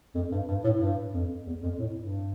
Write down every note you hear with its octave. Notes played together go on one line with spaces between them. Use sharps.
F2
G2
G2
A2
G2
F2
E2
F2
A2
G2